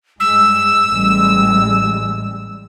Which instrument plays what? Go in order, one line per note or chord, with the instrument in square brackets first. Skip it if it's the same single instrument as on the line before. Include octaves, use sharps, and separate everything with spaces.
[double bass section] G2 G#3 [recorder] E6
[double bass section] A1 G3 G#3